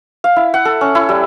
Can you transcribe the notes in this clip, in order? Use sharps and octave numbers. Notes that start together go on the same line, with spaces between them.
F5
E4
F#5
A4
C#4
E4
G3